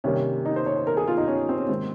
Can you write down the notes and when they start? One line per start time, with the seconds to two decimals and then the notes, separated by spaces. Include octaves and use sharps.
0.04 C3 D#3 G3 A#3 C#4
0.46 D#4
0.56 C5
0.66 C#5
0.76 C5
0.87 A#4
0.97 G#4
1.08 F4
1.18 D#4
1.28 C#4
1.49 C4
1.58 C#4
1.69 G#2 D#3 A#3 C4